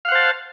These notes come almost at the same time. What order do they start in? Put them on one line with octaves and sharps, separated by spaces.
F5 F#5 C5 A5